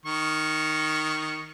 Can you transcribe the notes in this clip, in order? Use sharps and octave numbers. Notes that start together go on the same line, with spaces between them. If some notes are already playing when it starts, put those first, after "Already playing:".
D#3 C#6